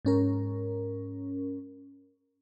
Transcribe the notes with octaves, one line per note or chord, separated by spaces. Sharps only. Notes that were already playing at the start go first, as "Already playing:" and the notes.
G#2 C#4 A#4